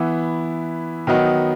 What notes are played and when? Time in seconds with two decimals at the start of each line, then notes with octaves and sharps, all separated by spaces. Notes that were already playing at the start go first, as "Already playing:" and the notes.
Already playing: E3 B3 E4
1.07 D#3 F#3 B3 D#4